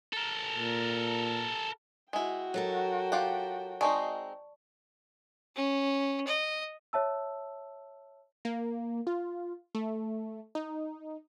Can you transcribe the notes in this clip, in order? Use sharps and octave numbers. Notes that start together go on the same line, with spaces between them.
A4 A#4
A#2
G#3 E4 F#4 G5
F#3 A4 A#4
F4 G4 F#5
G#3 C4 D#4 D5 A5 C#6
C#4
D#5
C#5 E5 A5 E6
A#3
F4
A3
D#4